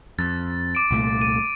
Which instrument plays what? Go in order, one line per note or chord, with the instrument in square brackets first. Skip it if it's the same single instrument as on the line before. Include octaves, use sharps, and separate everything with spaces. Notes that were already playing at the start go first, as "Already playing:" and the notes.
[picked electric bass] F2 [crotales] A6
[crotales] D6 D7
[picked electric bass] C2 A#2 A3
[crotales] D#7